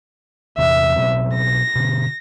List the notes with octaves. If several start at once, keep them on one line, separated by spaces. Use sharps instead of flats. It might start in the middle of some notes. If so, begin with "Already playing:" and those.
E2 C3 E3 E5
B2 F#3 C4
A#6
B2 D3